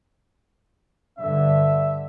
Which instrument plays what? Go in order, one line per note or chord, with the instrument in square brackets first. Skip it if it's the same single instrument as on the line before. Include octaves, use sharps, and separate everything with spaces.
[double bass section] G2 D3 [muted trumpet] E5